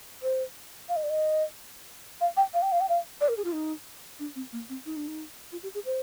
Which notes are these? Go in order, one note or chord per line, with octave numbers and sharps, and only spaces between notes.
C5
F5
D#5
D5
D#5
F5
G5
F5
G5
F5
G5
F5
D5
A#4
G#4
F4
D#4
D4
C4
A#3
C4
D#4
D4
D#4
F4
G4
G#4
C5